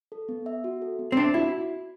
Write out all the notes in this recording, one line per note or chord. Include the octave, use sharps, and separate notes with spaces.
A4
B3
E5
F#4
A4
B3
C4
D4 E5
E4 F#4